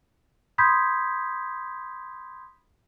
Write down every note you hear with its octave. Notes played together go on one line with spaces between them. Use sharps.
B5 C6 D#6 G6 G#6 B6